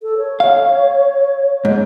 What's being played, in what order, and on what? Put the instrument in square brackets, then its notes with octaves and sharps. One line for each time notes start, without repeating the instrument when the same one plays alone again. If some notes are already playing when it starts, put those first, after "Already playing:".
[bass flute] A4
C#5
[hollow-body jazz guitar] F5
G#2